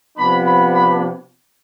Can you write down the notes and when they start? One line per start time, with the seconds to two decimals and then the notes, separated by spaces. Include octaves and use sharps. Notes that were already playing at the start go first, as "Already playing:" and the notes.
0.17 C3 F3 B3 D4 B5
0.45 B5
0.74 B5